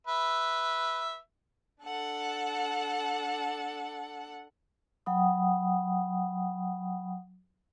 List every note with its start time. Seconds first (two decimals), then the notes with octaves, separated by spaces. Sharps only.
0.07 B4 E5
1.83 D4 A4 F#5
5.06 F#3 F#5 G5 B5 D#6